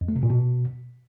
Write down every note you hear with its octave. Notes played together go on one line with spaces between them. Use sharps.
F2
A3
C3
A#2
B2